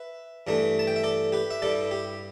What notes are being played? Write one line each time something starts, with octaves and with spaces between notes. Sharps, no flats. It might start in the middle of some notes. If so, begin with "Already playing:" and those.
Already playing: B4 E5
G2 E3 A3 D4
A5
G5
E5
A4 D5
G4 B4
E5
G2 G3 E4 A4 D5
G4